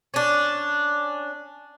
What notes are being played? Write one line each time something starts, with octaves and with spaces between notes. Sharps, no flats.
C#4 D4